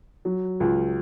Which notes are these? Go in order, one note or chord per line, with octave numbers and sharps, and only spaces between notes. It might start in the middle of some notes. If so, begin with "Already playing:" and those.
F#3
C#2